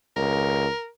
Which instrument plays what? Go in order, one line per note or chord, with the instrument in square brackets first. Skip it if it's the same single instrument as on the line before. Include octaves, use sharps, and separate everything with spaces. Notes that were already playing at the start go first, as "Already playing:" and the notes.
[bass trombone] C#2 [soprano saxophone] A#4